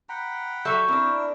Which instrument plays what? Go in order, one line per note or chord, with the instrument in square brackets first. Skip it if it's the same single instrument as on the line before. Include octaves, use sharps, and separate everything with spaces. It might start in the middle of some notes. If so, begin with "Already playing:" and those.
[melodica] F#5 G5 B5 [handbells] A#5
[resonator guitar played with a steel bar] F#3 A4 E5 [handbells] C#6 G6
[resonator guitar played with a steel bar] C4 D4 [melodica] E4 A#4